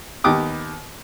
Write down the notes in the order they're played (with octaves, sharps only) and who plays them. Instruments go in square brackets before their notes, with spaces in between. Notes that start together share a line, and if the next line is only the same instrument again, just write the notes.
[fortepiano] D#2 B3 G4 D6 D#6